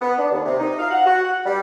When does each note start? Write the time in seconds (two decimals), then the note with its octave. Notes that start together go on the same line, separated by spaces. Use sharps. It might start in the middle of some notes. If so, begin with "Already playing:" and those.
0.01 B3
0.18 D4
0.31 D#2
0.45 C3
0.60 D#4
0.79 F5
0.91 F#5
1.06 F#4
1.24 F#5
1.45 G3